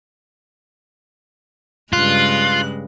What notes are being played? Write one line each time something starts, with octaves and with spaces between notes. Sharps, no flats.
G2 C#3 G#3 F4 F#6